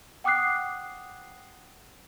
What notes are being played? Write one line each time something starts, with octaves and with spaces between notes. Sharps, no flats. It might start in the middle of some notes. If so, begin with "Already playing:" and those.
F#5 G5 D6 D#6 F#6 C7